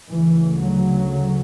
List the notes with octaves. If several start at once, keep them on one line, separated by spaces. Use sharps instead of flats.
D2 C#3 E3
F#3